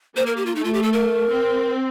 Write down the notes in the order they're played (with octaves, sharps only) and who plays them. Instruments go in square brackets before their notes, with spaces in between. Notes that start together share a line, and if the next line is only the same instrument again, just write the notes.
[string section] A#3 [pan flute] C5
[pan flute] A#4
G4
F4
[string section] A3 [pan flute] D#4
[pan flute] F4
G4
A4
A#4
[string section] C4